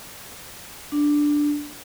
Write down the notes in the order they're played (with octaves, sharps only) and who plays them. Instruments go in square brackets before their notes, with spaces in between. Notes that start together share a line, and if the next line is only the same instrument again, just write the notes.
[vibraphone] D4